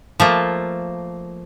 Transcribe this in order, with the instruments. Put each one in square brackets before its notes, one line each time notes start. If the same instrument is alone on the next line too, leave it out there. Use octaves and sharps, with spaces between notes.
[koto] F3 A3 A#3